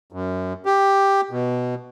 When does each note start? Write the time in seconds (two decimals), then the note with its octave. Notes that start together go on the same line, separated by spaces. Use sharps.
0.13 F#2
0.66 G4
1.31 B2